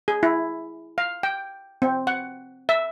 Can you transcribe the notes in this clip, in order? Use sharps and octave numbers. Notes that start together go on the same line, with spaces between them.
G#4
E4
F5
G5
C4
F#5
E5